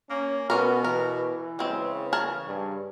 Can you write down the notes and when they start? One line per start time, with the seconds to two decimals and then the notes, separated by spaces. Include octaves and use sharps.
0.10 A#3 C#4
0.50 B2 B3 C#4 A#4
0.84 E3 A#4
1.59 C#3 G#3 C4
2.13 G#4 A#4 A5
2.47 G2